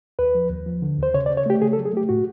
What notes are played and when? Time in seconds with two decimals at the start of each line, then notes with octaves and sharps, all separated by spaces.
0.19 D#2 B4
0.35 F3
0.50 D#2
0.66 F3
0.82 D3
0.98 D#2 C5
1.14 C#3 C#5
1.26 D5
1.30 C#3
1.37 C#5
1.46 A3 G4
1.62 C#3 G#4
1.73 A4
1.78 F#3
1.85 G#4
1.93 A3 G4
2.09 A2 F#4